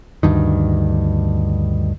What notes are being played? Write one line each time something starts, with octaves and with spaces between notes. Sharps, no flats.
D2 G2 D#3